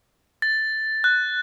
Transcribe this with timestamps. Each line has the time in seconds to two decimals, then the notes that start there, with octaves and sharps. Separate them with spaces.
0.42 A6
1.04 F#6